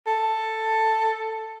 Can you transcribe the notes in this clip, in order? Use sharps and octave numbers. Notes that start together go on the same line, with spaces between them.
A4